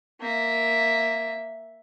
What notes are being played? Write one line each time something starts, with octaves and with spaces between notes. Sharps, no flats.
A#3 E5